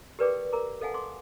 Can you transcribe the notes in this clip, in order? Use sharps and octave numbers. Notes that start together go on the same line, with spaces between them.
G4 A#4 B4 D5 G5 D6
A#4 A#5 D6
A4 D#5 F5 F#5 G#5 A5
C6 D6